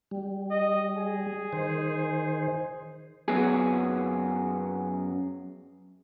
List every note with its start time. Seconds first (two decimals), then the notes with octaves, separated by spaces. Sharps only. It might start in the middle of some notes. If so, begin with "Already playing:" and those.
0.11 G3
0.51 D#5
0.97 G#4
1.53 D#3 C5
3.28 F#2 F#3 B3 G#4